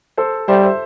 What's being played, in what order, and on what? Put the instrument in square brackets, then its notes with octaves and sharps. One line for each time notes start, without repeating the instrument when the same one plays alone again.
[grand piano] A4 C5
[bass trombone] G3 [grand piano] C5 E5
[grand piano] C5 E5